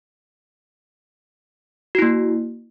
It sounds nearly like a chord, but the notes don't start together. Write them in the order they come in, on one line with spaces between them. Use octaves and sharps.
F#4 E4 A#3